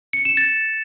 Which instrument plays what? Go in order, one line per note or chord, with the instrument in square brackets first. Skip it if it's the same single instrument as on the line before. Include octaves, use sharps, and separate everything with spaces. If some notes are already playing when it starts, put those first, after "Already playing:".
[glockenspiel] C#7
E7
A6